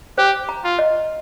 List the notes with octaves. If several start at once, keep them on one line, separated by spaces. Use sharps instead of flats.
G4 C5
A#5
F4
D#5